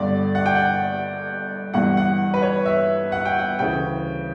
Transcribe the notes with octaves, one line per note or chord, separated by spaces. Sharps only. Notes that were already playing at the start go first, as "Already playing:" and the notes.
Already playing: G1 G2 D3 D5
F#5
G5
F#5
G1 G2 E3 F#5
F#5
B4
C#5
E5
F#5
G5
F#5
D2 C#3 E3 G5